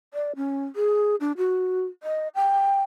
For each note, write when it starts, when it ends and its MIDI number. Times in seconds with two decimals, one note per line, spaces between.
0.14 0.32 74
0.36 0.66 61
0.76 1.16 68
1.20 1.32 62
1.38 1.84 66
2.03 2.28 75
2.35 2.82 79